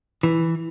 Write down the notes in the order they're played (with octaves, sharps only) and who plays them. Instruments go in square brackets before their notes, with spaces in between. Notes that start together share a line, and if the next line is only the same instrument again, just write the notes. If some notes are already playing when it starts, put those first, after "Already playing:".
[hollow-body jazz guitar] E3